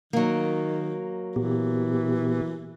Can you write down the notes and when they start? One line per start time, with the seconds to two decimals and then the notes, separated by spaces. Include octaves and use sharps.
0.13 D#3 F#3 A#3
1.36 A#2 E3 B3 G4